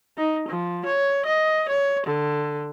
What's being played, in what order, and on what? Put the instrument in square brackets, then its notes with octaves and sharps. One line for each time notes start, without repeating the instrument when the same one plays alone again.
[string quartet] D#4
F3
C#5
D#5
C#5
D3